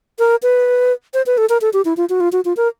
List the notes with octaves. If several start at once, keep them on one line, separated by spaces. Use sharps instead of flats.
A#4
B4
C5
B4
A4
A#4
A4
G4
E4
F4
F#4
F4
F#4
F4
A#4